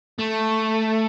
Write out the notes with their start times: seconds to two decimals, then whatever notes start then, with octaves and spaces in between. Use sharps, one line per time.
0.19 A3